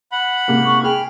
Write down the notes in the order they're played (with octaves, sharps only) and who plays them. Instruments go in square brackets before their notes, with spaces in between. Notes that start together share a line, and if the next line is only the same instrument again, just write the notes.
[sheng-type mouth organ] F#5 B5
[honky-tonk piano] G#2 C3 A#3
[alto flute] C#6
[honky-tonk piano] G#4 [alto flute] G5 [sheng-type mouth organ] B5 F6